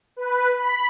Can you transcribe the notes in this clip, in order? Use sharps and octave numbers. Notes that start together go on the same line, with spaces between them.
B4
B5